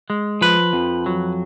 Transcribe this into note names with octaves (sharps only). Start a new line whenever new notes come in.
G#3
F3 B4
F2
F#3